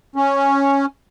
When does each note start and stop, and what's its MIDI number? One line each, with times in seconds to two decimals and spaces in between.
0.16 0.86 61